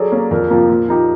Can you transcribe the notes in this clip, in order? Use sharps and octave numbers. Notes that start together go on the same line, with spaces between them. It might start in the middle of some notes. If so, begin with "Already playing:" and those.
Already playing: F#3 G#4 A4 D5
A#3 C#4
F2 A#4
C3 F3 A#3
A#2
F3 A#3 D#4 G4